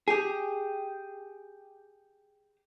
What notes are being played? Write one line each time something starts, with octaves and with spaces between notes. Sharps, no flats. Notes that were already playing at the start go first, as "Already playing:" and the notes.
G4 G#4